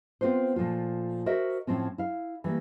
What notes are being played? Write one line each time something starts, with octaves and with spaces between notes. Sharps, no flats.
B3 C4 F4 B4 C5
A#2 F3 A3 F4
F#4 A#4 C5 D#5 E5
A2 F3 C4 C#4
E4 F5
E3 G3 A3 A#3